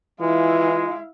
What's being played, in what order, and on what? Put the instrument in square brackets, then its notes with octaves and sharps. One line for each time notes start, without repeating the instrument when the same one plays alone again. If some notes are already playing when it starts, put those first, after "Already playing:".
[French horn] E3 [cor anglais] G#3 [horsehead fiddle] E4 F5 [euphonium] F4